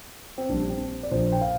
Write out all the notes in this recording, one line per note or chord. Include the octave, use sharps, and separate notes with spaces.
C4
A#1 A#2 G3 D4
C4
D5
A#1 A#2 F3 C5
G5
F5